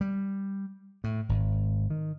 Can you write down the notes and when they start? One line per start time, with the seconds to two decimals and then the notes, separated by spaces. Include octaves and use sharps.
0.01 G3
1.04 A2
1.29 G#1
1.90 D#3